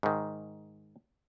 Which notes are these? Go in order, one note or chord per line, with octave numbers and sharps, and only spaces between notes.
G#2 D#3